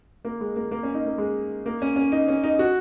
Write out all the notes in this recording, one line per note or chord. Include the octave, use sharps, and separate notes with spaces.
A#3
G#3
A#3
A#3
C#4
D#4
A#3
G#3
A#3
C#4
C#4
D#4
C#4
D#4
F#4